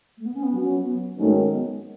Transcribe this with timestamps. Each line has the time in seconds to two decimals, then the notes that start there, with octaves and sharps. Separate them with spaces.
0.17 A3
0.25 B3
0.34 C#4
0.43 B3
0.51 F#3 C#4 F#4
0.84 B3
1.17 G#2 D#3 F#3 A3 C#4
1.52 B3